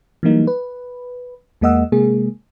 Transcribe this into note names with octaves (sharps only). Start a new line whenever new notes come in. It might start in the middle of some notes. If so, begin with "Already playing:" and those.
E3 F#3 G3 A#3 D#4
B4
E2 G#3 A#3 D#5 F#5 E6
C3 G#3 A#3 G#4